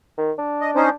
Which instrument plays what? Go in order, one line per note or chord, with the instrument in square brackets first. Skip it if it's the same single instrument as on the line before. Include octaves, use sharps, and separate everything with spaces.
[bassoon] D#3
D4
[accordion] D#5
C#4 D#4 C5